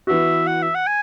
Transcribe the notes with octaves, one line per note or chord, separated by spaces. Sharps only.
E3 B3 F#4 E5
F#5
E5
F#5
G#5